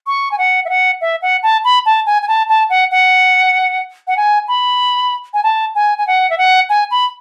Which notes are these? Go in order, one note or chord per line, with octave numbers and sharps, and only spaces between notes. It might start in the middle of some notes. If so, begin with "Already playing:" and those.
C#6
G#5
F#5
E5
F#5
E5
F#5
A5
B5
A5
G#5
G#5
A5
A5
F#5
F#5
F#5
G#5
B5
G#5
A5
G#5
G#5
F#5
E5
F#5
G#5
B5